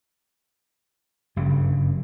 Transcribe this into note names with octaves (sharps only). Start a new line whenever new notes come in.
F#1 G2 C#3